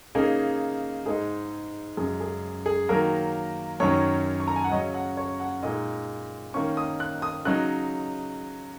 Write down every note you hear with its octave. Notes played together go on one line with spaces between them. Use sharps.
C#3 A#3 D#4 G#4
G#2 G#3 D#4 G#4
F#2 C#3 G#3 G#4
G#4
G#4
D#3 F#3 A#3 A#4
F#2 D#3 F#3 C#4 C#5
C#6
A#5
G#5
F#5
C#3 F#3 C#4 D#5
F#5
C#5
F#5
A#2 G#3 D#4 D#5
D#3 A#3 C#4 C#6
D#6
F#6
D#6
C#3 F#3 D#4 F#6